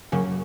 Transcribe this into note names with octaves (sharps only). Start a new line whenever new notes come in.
F#2 C#3 F#3 A#3 C#4